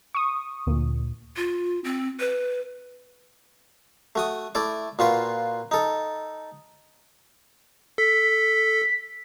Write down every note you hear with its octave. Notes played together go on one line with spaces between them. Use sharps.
C#6 D#6
D2 A#2
F4
C4
B4
A3 F#4 D#6
A3 E4 D5 D6
A#2 F4 F#4 B4
D#4 A4
A4 B6